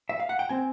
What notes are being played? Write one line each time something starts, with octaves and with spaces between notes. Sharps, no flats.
E5
F5
F#5
G5
C4 G#5